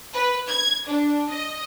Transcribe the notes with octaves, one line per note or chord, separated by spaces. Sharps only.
B4
G#6
D4
D#5